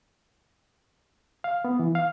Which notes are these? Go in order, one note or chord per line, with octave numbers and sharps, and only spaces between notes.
F5
B3
E3
F5